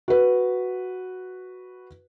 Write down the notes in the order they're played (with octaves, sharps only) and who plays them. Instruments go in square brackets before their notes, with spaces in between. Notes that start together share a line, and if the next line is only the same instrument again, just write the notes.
[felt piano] F#4 B4